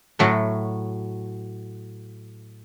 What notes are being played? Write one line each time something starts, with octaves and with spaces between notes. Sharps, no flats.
A2 F#3 A3